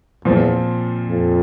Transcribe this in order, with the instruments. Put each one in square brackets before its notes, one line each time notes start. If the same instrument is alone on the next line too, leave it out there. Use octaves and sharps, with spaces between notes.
[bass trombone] E2 [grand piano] A#2 F3 C4
[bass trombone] F2